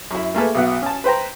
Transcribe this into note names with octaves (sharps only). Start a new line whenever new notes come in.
F#2 E4
A3 A#3 G#4 A4 B4
B1 B2 E5 F#5
C#4 A5
B4 C5 G5 A#5